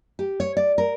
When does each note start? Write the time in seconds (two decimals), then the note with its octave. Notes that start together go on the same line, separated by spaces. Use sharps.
0.19 G4
0.40 C#5
0.57 D5
0.78 A#4